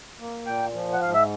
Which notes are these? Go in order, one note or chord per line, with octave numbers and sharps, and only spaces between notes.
A#3
A#2 G5
F3
F#5
G#2 F5
E5